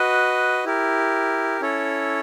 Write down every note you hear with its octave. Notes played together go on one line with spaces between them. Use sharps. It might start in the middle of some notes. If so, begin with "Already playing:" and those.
Already playing: F#4 B4 D#5
E4 G4 A#4
C#4 E4 A4 C#5